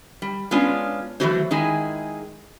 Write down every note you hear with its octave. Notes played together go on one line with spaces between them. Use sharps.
G3
G#3 B3 C#4 D4 F4
E3 F#3 A3 A#3 F#4 C5
D#3 G#3 E4 G#4